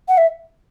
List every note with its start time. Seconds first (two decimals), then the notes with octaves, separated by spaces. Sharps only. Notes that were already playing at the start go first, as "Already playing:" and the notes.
0.08 F#5
0.17 E5